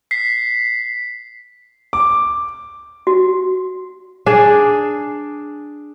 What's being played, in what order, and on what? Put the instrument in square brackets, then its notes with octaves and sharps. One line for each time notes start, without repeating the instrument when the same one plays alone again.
[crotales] B6 C7
[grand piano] D6
[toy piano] F#4
[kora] D4 G#4